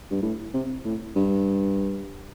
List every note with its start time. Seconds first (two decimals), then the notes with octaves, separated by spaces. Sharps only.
0.11 G2
0.22 A2
0.54 C3
0.85 A2
1.15 G2